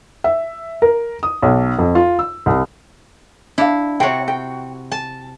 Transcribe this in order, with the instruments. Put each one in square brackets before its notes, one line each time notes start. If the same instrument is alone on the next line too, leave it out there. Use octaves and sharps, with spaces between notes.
[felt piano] E5
A#4
D#6
B1
F2
F4
E6
C2
[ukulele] D4 F5 [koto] E4
[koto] C3 F#4 [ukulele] C#5 G5
[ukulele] G5
[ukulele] G#5 [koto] A5